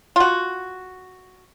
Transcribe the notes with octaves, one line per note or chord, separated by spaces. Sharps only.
F4 F#4